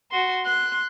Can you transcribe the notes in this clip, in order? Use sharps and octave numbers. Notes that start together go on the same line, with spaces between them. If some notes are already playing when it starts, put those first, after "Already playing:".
F#4 C6
C6 F#6